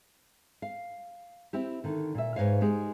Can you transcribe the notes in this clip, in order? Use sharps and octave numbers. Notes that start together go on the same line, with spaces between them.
F5
C4 E4 G4
D3 D#3
A#2 E5
G#2 B4 C#5 F5
G#3 D#4 G4 G#4